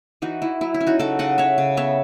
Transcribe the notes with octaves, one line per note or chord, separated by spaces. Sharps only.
E3 D#4 F#4
E3 E4
F#3 E4
E4
C#4
D#4 F#4
C#3 F#4 A4
C#3 D#5 F#5
C#3 C#5 E5
C#3
B3 C#5 E5